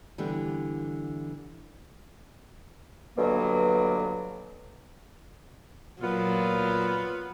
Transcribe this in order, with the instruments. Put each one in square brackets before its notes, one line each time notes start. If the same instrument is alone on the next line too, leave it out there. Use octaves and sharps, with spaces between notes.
[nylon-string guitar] D3 E3 G3 B3
[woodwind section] G2 B2 D3 F#3 A#3
[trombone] A#2 [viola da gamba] F#3 [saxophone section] B3 F4